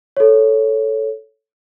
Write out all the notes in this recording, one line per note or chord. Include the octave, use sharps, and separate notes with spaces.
A4 C#5